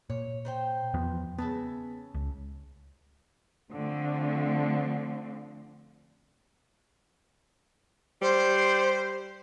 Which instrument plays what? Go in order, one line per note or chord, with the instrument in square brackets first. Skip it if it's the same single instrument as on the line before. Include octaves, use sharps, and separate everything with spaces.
[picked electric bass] A#2 [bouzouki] C#5
[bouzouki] D#4 C5 G5
[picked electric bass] E2 F3 B3
[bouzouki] C#3 E5 A5 [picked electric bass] B3
[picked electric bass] C#2
[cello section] D3 F3 A3 C4
[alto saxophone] G3 [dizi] C5